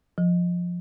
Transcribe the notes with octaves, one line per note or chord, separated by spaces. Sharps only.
F3